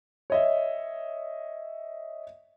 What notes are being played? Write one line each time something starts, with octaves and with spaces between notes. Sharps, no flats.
C#5 D#5 E5